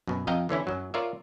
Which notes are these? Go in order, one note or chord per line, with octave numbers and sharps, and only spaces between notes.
F#2 B2
F2 D#5 F5 G5 A#5
D3 E3 C#4 E4
F#2 F#3
F4 A#4 C#5 D5 E5